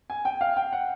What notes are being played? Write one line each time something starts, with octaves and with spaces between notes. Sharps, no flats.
G#5
G5
F5
G5
F#5